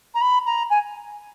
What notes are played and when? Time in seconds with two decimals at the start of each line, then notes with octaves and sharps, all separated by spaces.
0.14 A#5
0.21 B5
0.45 A#5
0.70 G#5